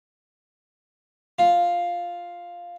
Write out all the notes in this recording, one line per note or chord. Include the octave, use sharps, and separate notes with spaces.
F4